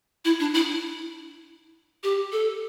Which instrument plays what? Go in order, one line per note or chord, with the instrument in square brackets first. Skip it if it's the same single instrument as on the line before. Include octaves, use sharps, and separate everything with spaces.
[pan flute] E4
D4
E4
G4
A4